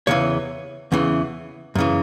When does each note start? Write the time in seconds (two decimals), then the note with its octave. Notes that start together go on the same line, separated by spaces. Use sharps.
0.07 E2 C#3 E3 C#5
0.92 E2 C#3 E3
1.75 F#2 C#3 E3